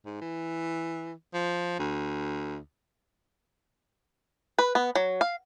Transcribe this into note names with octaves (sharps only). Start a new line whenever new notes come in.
G#2
E3
F3
D2
B4
B3
F#3
F5